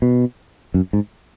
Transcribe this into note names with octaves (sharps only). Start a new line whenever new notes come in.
B2
F#2
G#2